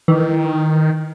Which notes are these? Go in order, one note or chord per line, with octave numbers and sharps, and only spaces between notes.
D#3 E3